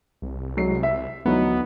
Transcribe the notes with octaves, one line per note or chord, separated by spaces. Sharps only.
C2
F#3 G#3 C7
E5
D2 E3 F#3 B3 D#4